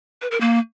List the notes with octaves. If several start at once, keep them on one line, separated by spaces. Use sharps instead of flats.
B4
A#4
A#3